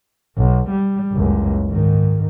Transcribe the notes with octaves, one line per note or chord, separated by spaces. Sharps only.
B1
G3
F#1 C#2
G#2 D#3